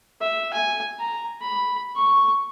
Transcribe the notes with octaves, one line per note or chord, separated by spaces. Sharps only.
E5
G#5
A#5
B5
C#6